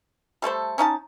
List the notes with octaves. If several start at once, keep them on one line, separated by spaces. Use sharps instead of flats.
G3 A3 A4 C5
C#4 D#4 F5 A5